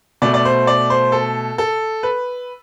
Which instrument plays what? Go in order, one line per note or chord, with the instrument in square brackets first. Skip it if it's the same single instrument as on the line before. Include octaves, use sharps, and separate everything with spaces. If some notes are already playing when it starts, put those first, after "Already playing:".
[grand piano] B2 A3 D5
D5
C5
D5
C5
A4
A4
B4